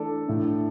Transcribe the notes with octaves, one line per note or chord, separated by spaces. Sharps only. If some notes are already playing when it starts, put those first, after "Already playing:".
Already playing: E3 A3 D4 A4 D5
A2 A3 D4